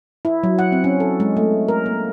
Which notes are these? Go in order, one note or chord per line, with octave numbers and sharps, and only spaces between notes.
E4
F#3
F#5
C4
C#4
A4
G#3
A3
A#4
A#3